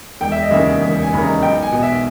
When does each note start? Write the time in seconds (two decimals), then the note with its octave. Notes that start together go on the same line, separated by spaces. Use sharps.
0.21 E1 G5
0.32 E5
0.42 D#5
0.51 D#2 C#3 E3 E5
0.81 E1
1.02 G#5
1.12 D#2 C#3 E3 B5
1.22 A#5
1.42 B1 G5
1.62 G#5
1.72 B2
1.83 E5